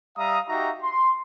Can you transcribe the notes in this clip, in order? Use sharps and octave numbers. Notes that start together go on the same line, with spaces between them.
G3 E5 F5 A#5 D#6
D#4 F#4 G4 E5 F5 A#5
C6